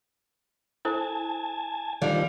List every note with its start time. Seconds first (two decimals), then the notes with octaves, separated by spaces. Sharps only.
0.85 E4 A4 C5 G#5 A5
2.02 D3 D#3 F3 G3 F5